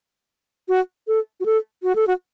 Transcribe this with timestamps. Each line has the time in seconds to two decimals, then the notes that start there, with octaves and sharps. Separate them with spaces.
0.68 F#4
1.08 A4
1.40 F#4
1.46 A4
1.83 F#4
1.96 A4
2.07 F#4